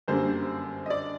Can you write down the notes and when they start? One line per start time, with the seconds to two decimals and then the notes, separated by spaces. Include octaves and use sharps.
0.08 G1 F#2 D3 G3 A#3 C5
0.86 D#5
0.90 D5